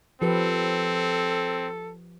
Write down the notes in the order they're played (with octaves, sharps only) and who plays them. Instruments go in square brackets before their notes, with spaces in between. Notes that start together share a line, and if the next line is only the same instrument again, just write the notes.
[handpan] F3 G4 B4 [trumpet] C4 [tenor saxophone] A4